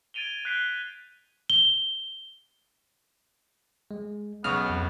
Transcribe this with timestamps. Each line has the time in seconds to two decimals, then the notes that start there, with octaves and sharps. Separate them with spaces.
0.14 G#6 A6 D7 D#7 F7 G7
0.45 F#6 G6 B6 C7 D7 G7
1.50 G7
3.91 G#3
4.44 B1 C#3 B3 C#6 D#6 F6
4.70 F2